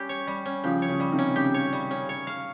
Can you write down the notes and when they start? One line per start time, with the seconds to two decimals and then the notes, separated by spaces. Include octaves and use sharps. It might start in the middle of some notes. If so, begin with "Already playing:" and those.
Already playing: G3 C#4 G4
0.09 C#5
0.27 G3
0.46 C#4
0.64 C#3 F3 G4
0.82 C#5
0.88 C#3
1.00 G3
1.12 C3 D#3
1.19 C#4
1.36 C#3 G4
1.54 C#5
1.73 G3
1.91 C#4
2.09 C#5
2.27 F5